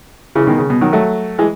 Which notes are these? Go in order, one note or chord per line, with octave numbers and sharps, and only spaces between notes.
C#3 E3
B2 D#3
C#3
B2
D#3 F#3
F#3 A3
E3 G#3